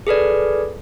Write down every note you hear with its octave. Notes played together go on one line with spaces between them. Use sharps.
G#4 A4 B4 D5